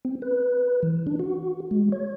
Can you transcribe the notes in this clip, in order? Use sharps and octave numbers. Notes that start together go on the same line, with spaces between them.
C4
B4
E3
D4
F#4
G#3
C#5